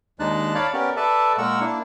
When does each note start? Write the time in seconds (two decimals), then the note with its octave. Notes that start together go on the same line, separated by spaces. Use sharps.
0.20 D#2 G#3 D4 D#4 A5 F#6
0.55 C#5 D5 F5 A5 B5
0.74 B3 C#4 G4 A#4 D5
0.97 A4 B4 D5 E5 A5
1.38 A#2 G#3 A#4 F#5 C#6 E6
1.61 A#3 D4 E4